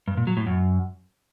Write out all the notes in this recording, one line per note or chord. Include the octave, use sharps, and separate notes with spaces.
G2
A#2
F#3
A2
F#2